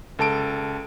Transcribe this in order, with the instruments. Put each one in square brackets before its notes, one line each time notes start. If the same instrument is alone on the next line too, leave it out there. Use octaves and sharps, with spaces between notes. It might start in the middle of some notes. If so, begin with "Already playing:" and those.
[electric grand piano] C#2 A4 A5 D7